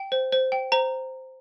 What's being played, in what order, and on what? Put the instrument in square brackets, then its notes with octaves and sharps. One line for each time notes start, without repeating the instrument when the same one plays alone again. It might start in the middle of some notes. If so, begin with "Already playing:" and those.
Already playing: [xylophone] G5
C5
C5
G5
C5 A#5